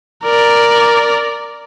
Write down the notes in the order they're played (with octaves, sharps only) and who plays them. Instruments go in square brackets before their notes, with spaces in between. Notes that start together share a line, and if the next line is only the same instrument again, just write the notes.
[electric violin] A#4 D5